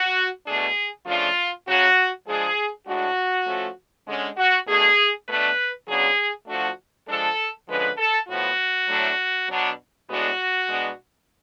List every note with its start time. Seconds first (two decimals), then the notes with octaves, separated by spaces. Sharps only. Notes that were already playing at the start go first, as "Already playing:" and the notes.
Already playing: F#4
0.46 B2 A3 D4 G#4
1.06 C#3 F3 A3 D4 F4
1.66 C#3 F#3 C#4 F#4
2.27 F3 G#3 D4 G#4
2.87 A2 G#3 D4 F#4
3.46 F3 A3 C#4
4.08 D3 G#3 C#4
4.37 F#4
4.67 B2 A3 D4 G#4
5.27 B2 A3 D4 B4
5.88 C#3 F#3 B3 D4 G#4
6.48 F3 A3 D4 F#4
7.08 F3 G#3 D4 A4
7.67 D3 F3 G#3 C#4 B4
7.98 A4
8.28 A2 F3 B3 F#4
8.88 A2 F#3 A3 D4
9.49 B2 F#3 B3 D4
10.09 A2 G#3 B3 D4 F#4
10.69 B2 G#3 B3 D4